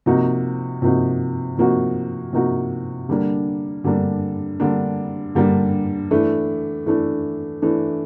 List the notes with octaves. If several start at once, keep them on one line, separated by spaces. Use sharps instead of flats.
C3 F3 A#3 D#4 F#4
C3 F3 A#3 D#4 F#4
C3 F3 A#3 D#4 F#4
C3 F3 A#3 D#4 F#4
D3 G3 A#3 D4
D3 G3 A#3 D4
D3 G3 A#3 D4
D3 G3 A#3 D4
E3 A3 D4
E3 A3 D4
E3 A3 D4